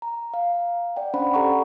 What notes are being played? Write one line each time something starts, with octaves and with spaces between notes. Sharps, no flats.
A#5
F5
D5 F#5 G5
C#4 D4 C5 F#5 B5
G4 A4 F#5 A#5 C#6